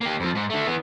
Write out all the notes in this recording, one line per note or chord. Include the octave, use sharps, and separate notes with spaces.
A#3 G4
F2 F3
G#2
D3 A3
E3 B3